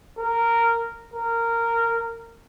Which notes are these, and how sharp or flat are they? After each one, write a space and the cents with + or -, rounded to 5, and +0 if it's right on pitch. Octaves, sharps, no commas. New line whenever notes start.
A#4 -10
A#4 -15